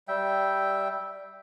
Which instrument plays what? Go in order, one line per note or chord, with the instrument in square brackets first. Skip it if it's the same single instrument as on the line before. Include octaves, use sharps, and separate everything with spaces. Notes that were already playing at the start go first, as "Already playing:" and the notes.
[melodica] G3 E5 G5